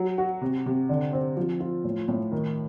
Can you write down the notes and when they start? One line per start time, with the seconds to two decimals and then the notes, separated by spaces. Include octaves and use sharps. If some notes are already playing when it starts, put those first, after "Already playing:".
Already playing: F#3
0.18 F#4
0.41 C3
0.66 C3
0.89 D3
1.13 C4
1.37 F3
1.60 F4
1.84 A2
2.08 A2
2.32 D#3